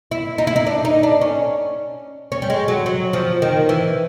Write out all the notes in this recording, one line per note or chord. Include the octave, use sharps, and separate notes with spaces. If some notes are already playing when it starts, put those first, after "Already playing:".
E4
D#4
E4
D#4
D4
D#4
D4
C#4
C#4
G3
G#3
F#3
F#3
F3
D#3
E3